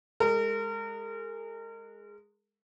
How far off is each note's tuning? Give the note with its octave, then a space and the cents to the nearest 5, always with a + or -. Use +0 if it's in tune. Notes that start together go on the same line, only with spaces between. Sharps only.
G#3 -5 A#4 -35